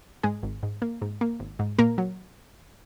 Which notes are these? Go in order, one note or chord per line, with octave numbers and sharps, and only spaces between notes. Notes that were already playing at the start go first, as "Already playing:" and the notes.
G#2 G#3 G#4
G#1
G#2
A#3
G#2
A#3
G#1
G#2
A#2 A#3 A#4
F#3